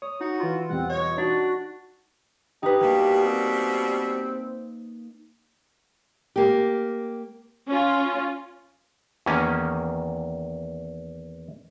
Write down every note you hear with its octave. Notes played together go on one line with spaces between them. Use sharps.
C#5 D#6
D#4 F#4
E3 E4 F4
E2 B2 G3 C4 F#5
C#5 D#5
D4 D#4 F#4
D#4 G4 B4
B2 G3 A#3
C4
A#3 G4
C#4 F4
E2 D#3 A#3 C#4 D#5